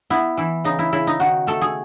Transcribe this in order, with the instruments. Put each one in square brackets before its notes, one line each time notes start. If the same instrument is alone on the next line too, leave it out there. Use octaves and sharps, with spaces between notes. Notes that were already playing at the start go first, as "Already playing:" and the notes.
[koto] B3 E4
E3 E4
C#3 D#4
E4
C#3 E4
D#4
D#3 F#4
A3 A4
G#4